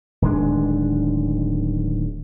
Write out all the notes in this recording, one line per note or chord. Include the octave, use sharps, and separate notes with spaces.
D1 D#3 G#3 D4